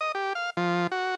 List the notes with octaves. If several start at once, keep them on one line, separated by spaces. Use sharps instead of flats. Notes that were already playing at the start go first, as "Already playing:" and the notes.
D#5
G4
F5
F3
F#4